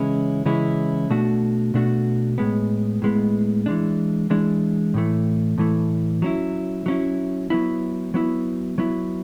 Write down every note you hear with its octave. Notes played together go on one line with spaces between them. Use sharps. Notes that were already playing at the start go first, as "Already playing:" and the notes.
Already playing: C#3 E3 G#3 C#4 E4
C#3 E3 G#3 C#4 E4
B2 A3 D4 F#4
B2 A3 D4 F#4
A2 G#3 B3
A2 G#3 B3
E3 G#3 D4
E3 G#3 D4
A2 E3 A3
A2 E3 A3
F#3 C#4 E4
F#3 C#4 E4
F#3 B3 E4
F#3 B3 E4
F#3 B3 E4